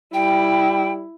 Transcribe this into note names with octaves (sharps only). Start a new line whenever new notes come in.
G3 E4 G5